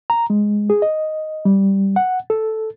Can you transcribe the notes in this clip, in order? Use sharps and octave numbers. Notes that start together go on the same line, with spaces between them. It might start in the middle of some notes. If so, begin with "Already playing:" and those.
A#5
G#3
G#4
D#5
G3
F#5
A4